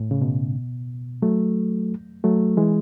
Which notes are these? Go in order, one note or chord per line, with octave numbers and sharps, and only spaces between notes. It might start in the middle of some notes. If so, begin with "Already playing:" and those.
Already playing: A2
C#3
B2
F#3 A3
F#3 A3
E3 G#3